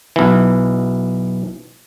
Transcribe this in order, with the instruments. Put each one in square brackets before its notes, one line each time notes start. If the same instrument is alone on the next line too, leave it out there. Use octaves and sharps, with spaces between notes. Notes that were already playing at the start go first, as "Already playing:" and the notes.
[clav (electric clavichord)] B1 E3